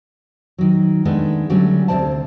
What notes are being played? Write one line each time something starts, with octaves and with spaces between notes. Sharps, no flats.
D#3 F#3
D#3 G#3 A3 B3 D4
D3 F#3 G3 A3 C#4
D2 C3 F3 C5 D5 A5